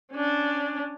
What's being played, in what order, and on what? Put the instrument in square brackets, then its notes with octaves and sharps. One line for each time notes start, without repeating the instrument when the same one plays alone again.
[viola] C#4 D4